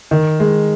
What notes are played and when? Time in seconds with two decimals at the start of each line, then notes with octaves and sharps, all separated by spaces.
0.11 D#3
0.40 G#3